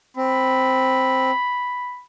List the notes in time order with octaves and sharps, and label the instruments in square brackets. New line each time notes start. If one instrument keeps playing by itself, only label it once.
[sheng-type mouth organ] C4 [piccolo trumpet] B5